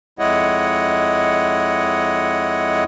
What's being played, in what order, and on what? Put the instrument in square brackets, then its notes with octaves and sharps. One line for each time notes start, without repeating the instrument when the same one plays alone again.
[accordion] F2 G#3 E4 C#5 D#5 F#5